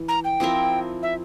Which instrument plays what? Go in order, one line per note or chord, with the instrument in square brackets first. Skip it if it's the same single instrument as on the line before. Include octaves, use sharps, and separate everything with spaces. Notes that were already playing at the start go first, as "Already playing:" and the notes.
Already playing: [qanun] E3
[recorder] A#5
G5
[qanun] F3 C4 E4 A#4
[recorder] E5